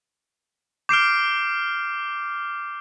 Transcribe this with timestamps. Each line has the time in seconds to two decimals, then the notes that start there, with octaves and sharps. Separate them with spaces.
0.89 D6 F6 G6 C7 D7